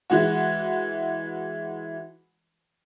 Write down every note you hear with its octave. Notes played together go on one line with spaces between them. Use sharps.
E3 G#3 F#4